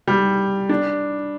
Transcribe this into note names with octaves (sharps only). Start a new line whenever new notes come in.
G3
D4